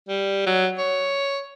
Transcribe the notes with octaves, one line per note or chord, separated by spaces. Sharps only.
G3
F#3
C#5